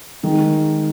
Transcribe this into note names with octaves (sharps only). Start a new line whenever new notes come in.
D#3 G#3